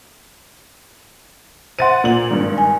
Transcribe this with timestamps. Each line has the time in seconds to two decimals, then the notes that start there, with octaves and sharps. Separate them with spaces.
1.79 C5 E5 F#5 C6 A6 D#7
2.04 A#2 F#7
2.30 G#1 G2
2.58 G#5